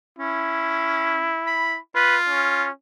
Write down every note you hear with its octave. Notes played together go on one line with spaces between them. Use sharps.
C#4 E4
B5
F4 B4
C#4